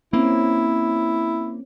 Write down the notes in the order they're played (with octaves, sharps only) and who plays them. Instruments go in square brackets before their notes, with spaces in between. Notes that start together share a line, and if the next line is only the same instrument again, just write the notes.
[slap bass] A#3 [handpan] C4 C#4 [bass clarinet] E4